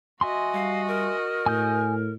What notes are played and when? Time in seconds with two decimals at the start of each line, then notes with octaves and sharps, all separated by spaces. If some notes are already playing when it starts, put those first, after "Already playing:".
0.21 F#4 D#5 E5 G#5 C6
0.54 G3 F5
0.88 A#4
1.46 A2 G#5 D#6 G6